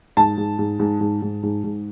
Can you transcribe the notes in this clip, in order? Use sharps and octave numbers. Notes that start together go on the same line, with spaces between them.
G#2 A5
G#2
G#2
G#2
G#2
G#2
G#2
G#2